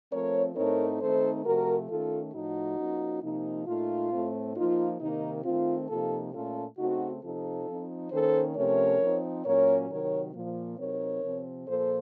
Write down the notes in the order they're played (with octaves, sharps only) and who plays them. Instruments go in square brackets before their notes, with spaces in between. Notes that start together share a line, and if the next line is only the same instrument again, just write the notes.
[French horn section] F3 A3 C4 A#4 C#5
A2 A3 C4 D#4 A#4 C#5
D#3 A3 C4 D#4 A4 C5
C3 F3 A3 F#4 A#4
D#3 A3 C#4 F4 A4
A2 F3 A3 D#4 F#4
F3 A#3 C#4
C3 F3 A#3 D#4
A#2 A3 D#4 F4
A2 A3 C4
F3 A#3 D#4 F4
C3 D#3 A#3 D#4
D#3 A3 C4 F4
C3 F3 A#3 D#4 F4 A4
A#2 A3 C#4 F4 A4
C#3 A3 C4 D#4 F#4
C3 F3 C4 D#4 F4 A4
F3 C4 D#4
D#3 A#3 C#4 A4 C5
C3 F3 A3 C#4 A#4 C#5
F3 C4 D#4
A#2 F#3 A#3 C#4 A#4 C#5
C3 D#3 F#3 A#4 C#5
A#2 F3 A#3
C3 F#3 C4 D#4 A#4 C#5
C3 F3 C4
A#2 F3 A#3 A4 C5